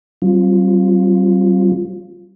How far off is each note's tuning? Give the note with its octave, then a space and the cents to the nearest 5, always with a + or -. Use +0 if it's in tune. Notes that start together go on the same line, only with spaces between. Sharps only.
G3 -45 C4 +20 F4 +0